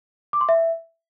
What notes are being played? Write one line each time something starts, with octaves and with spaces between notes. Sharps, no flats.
D6
C6
E5